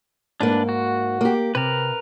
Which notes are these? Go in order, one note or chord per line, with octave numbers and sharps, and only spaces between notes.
G#2 A#3 D4 B4
F#4
A#3 G4
C3 A#4 B4